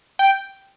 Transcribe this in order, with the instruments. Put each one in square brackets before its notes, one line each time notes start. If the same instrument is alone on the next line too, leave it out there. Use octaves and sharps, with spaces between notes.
[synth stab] G5